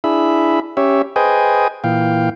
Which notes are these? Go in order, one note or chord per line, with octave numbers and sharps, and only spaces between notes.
D4 E4 G#4 E5 B5
C#4 G4 C#5 E5
G#4 B4 C5 D#5 G5 G#5
A#2 E3 F5 G5